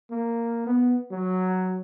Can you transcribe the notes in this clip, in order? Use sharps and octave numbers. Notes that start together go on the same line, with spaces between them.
A#3
B3
F#3